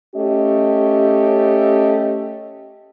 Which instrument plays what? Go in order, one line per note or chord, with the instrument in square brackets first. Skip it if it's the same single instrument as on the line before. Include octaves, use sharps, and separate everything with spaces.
[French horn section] A3 C#4 G4 D#5